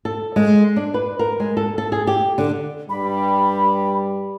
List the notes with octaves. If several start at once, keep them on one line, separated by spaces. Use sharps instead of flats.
A4
G#3
D4
B4
A#4
G#3
A4
A4
G#4
G4
D3
G2 G3 B5